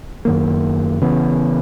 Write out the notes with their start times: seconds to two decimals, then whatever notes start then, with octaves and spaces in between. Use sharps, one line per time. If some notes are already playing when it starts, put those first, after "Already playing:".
0.25 F#2 D#3 A#3
1.01 C#3 E3 B3